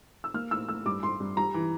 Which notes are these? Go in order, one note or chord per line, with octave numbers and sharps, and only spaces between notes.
E6
A#3 F6
A2 E6
A2 E6
G2 D6
G2 C6
G2
G3 A#5
E3